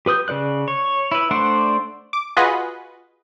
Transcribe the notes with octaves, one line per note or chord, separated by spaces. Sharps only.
G4 B4 D#6 G6
C#3 A4 D5 F#6
C#5
E4 B4
A3 D4 C5 D5 F#5
D6
F4 F#4 G#4 B4 D#5